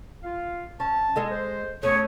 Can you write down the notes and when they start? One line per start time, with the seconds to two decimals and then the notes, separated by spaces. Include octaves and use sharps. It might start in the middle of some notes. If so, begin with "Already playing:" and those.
0.23 F4 F5
0.80 C#4 A5
1.16 G#3 A4 D#5
1.31 C5
1.83 E2 A3 C#4 A#4 C#5 D#6